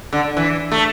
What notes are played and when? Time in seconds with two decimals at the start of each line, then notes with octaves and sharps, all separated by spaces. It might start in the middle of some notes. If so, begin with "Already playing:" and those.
0.13 D3
0.37 E3
0.72 A3